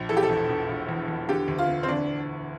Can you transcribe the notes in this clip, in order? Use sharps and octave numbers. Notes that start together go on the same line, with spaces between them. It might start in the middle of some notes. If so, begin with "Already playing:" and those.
Already playing: A#1
E3 A4
G4
A4
E1
E1
E1
E2
E2
D3 G4
D2
F4
D3
C4
D2 D4